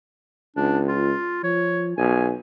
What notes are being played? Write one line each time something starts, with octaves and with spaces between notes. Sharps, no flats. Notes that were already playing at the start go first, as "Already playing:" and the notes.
C#2 D4
F4
F3 C#5
B1 G#5